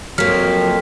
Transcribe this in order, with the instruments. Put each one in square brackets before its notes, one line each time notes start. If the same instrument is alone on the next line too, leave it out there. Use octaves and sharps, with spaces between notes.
[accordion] F2 [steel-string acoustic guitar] F#3 A#3 [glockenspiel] F6 B6